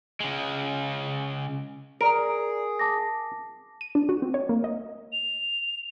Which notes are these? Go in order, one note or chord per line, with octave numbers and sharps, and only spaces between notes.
C#3 G#3
G#4 A#4 D5 D7
A5 D6 A#6
D#7
D4
F#4
C4
C#5
A#3
D#5
F7